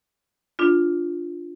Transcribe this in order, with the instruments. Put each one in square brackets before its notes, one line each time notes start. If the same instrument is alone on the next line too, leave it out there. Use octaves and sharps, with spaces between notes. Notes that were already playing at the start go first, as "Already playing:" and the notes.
[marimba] D4 F4